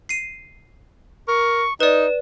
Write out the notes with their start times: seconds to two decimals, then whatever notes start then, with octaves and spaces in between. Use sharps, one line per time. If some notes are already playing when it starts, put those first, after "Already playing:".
0.09 C7 D#7
1.28 A#4 C#6
1.80 D#4 B4 D5 E7